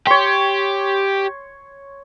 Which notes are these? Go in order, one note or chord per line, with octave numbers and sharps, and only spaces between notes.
G4 C#5 C6